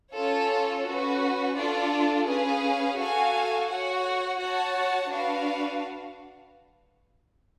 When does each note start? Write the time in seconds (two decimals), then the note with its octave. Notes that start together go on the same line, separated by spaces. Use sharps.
0.14 C#4 F4 A4 C#5
0.85 C#4 F#4 B4
1.57 D4 F4 A4 D5
2.28 C#4 G#4 B4 F5
2.98 F#4 A4 F5 G#5
3.70 F#4 C#5 F#5
4.40 F#4 C#5 F#5 A5
5.11 D4 F#4 B4 F5